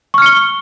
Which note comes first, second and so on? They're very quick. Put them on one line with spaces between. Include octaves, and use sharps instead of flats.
C#6 F6 C#7 G7